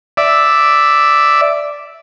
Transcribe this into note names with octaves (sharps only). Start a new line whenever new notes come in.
D5 E5